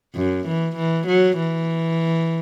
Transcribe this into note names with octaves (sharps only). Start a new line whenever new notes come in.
F#2
E3
E3
F#3
E3